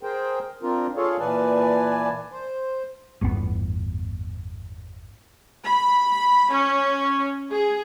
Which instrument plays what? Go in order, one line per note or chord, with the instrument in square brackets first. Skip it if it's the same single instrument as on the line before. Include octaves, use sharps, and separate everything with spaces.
[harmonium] G#4 A#4 C5 G5
C4 D4 F4 A#4
F4 G#4 A4 C#5 F5
A#2 E3 B4 D5 G#5 A5
C5
[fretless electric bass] G1 E2 A2 B3
[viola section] B5
C#4
G#4